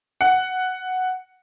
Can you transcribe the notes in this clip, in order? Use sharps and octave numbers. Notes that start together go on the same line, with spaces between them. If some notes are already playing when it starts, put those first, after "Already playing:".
F#5